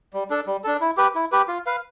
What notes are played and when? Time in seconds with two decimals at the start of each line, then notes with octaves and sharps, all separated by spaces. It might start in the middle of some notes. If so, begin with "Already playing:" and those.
0.14 G3
0.30 D4 A4
0.47 G3
0.64 D4 A4
0.81 E4
0.97 G4 B4
1.15 E4
1.32 G4 B4
1.48 F4
1.66 B4 F5